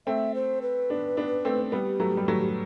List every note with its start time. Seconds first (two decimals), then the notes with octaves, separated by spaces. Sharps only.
0.07 A3 C4 E5
0.35 C5
0.62 B4
0.90 B3 D4
1.17 B3 D4
1.45 A3 C4
1.72 G3 B3 G4
2.00 F#3 A3
2.17 G3
2.28 F#3 A3